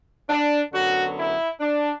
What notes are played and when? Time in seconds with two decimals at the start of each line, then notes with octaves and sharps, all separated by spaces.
0.30 D4
0.72 F#2 D3 F#3 B3 F#4
1.16 E4
1.60 D4